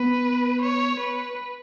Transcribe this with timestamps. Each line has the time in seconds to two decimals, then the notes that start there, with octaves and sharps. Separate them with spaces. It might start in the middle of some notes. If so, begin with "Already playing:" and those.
Already playing: B3 B4
0.62 C#5
1.00 B4